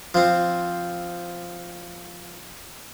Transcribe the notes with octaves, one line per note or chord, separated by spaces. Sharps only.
F3 C4